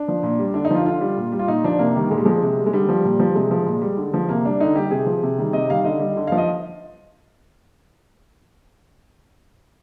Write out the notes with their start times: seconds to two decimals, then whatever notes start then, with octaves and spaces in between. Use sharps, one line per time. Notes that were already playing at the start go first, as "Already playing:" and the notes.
Already playing: D4
0.08 F3
0.23 A#2
0.39 G3
0.54 D3 D4
0.65 D#4
0.71 F3 F4
0.85 D3 F4
1.01 G3
1.18 A#2
1.32 G3
1.39 F4
1.48 A#2 D#4
1.64 F3 D4
1.79 C3 A#3
1.95 D#3 G3
2.11 A#2 G#3
2.18 G3
2.25 F3 G#3
2.42 C3
2.58 G3
2.66 G#3
2.72 D3 G3
2.89 F3
3.05 A#2
3.20 F3
3.35 C3 G#3
3.51 F3
3.66 A#2
3.82 G3
3.97 D3
4.14 F3
4.29 C3 A#3
4.45 G3 D4
4.60 D3 D#4
4.76 G3 G4
4.91 C3 G#4
5.06 F3
5.23 C3
5.38 D#3 G3
5.53 C3 D#5
5.69 D#3 G3 F5
5.84 D3 D#5
6.00 G3
6.17 D3
6.27 F3 F5
6.38 D#5